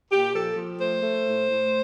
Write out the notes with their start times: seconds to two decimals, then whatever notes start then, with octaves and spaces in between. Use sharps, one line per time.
0.11 A#2 G4
0.33 F3 A4
0.56 F3
0.80 A3 C5
1.02 A3
1.25 A2
1.49 A2